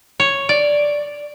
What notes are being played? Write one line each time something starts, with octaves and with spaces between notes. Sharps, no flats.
C#5
D5